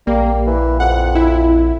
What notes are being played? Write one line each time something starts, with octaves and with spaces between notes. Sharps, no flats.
A#1 G3 A#3
E3
F2 F#5
E4